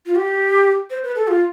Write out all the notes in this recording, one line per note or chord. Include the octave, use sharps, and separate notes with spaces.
F4
G4
C5
B4
A4
F4